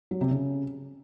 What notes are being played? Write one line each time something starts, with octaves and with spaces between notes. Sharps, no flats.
F#3
C3
C#3